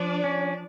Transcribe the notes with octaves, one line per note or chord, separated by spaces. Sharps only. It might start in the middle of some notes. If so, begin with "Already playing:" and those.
Already playing: F3 D4 D5
C#4